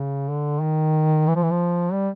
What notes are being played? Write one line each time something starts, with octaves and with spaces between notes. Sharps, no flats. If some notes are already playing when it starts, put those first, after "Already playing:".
Already playing: C#3
D3
D#3
E3
F3
E3
F3
G3